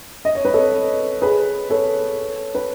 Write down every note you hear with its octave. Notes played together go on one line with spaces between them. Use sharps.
D#5
C#5
B4
A4 C#5
G#4 B4
A4 C#5
B4